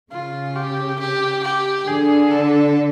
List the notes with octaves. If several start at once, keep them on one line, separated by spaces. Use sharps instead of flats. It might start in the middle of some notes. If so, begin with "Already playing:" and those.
C#3 F4
G4
G4
G4
D3 G#4
A4